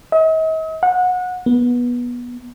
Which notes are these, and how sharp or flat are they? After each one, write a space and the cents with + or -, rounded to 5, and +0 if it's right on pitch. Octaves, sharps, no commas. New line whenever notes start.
D#5 +45
F#5 -25
B3 -20